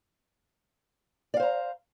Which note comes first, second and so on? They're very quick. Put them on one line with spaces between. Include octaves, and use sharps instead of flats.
D5 F5 C5 A#5